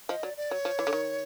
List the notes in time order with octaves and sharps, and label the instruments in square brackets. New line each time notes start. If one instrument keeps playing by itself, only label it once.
[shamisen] F3 [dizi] D#5
[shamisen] F#3 [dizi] D5
[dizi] D5
[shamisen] F#3 [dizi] C#5
[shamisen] F3
E3
D3
D#3